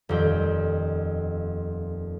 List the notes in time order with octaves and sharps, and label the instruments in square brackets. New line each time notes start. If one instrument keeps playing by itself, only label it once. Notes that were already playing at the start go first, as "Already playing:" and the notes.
[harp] D#1 F2 G5